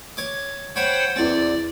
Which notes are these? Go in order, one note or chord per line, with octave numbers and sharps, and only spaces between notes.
C#5 D6
C5 C#5 F#5 G5 B5
E2 C4 D5